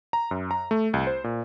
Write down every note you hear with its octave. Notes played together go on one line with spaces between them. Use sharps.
A#5
F#2
A#5
A3
C2
C5
A#2